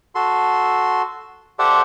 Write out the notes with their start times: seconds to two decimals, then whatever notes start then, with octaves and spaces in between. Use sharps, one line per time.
0.15 F#4 A4 C6
1.59 G4 A4 C5 D5 E5 F#5